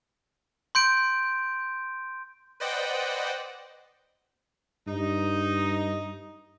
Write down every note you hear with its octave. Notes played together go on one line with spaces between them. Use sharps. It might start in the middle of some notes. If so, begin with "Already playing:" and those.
C6 G6 D7
B4 C5 D5 D#5 F#5 G5
G2 D#4